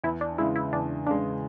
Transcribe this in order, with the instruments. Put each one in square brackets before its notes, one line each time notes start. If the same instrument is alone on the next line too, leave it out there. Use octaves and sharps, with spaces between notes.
[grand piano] E2 [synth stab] E4
[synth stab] D4
[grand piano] C#3 G#3 [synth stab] E4
[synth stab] E4
[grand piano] E2 [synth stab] D4
[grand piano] C#3 G#3 [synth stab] D4